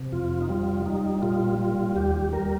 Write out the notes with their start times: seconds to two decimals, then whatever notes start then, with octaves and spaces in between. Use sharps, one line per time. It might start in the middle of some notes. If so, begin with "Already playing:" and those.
Already playing: C3
0.12 F2 F4
0.41 D#4
0.49 G3 F4
0.85 G3 D#4
1.22 A#2 F4
1.59 G3 F4
1.96 D#2 G4
2.33 G3 A#4